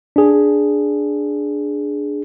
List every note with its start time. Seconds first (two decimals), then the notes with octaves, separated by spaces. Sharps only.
0.16 D4 G#4